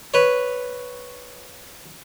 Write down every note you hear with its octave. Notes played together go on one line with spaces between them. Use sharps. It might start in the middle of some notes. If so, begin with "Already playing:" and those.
B4 C#5